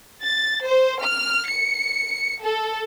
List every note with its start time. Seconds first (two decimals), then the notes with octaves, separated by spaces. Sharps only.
0.22 A6
0.64 C5
1.02 F6
1.47 C#7
2.41 A4